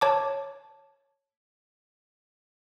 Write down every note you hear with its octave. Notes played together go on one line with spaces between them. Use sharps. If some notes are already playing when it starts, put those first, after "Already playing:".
C#5 A5 D6